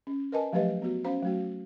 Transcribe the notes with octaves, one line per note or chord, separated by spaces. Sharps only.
C#4
A#4 B4 D#5 G#5 A5
F3 F#3 A3 G4 B4 D#5
B3 F#4
C#4 C5 F5 A#5
F#3 A3 F#4